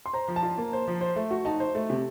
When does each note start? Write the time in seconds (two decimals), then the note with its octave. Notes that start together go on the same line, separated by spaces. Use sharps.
0.06 C6
0.13 C5 A#5
0.28 F3
0.36 A5
0.43 F4
0.58 A#3
0.73 C5
0.88 F3
1.01 C5
1.16 A3
1.31 F#4
1.45 D#4 A5
1.60 C5
1.75 A3
1.90 C3